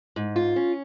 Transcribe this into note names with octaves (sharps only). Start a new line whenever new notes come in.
G#2
F4
C#4